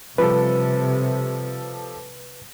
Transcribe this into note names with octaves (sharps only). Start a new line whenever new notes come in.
C3 F3 G3 A4 B4